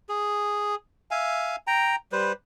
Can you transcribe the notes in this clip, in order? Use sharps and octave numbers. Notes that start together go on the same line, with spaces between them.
G#4
E5 F5 G#5
G5 A#5
G3 B4 C5